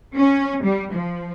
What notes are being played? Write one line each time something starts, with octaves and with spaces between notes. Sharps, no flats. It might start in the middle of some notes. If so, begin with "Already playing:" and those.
C#4
G3
F3